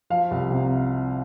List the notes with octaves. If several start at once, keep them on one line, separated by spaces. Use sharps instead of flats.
F3 F5
C2
C3